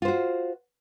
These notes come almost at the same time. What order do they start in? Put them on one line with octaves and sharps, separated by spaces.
F4 C5 F#4